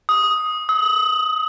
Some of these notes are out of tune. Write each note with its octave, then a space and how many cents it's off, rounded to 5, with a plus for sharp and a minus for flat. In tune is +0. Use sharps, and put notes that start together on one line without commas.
D#6 +5
D#6 +45